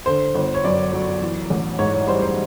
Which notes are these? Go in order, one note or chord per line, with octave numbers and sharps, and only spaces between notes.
D3 C5
G1
C#5
F#2 D5
F#3
E3
A1
G#2 C#5
C#5
G3 C5
C5